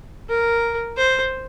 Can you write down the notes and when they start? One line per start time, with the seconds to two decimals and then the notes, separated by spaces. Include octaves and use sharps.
0.29 A#4
0.97 C5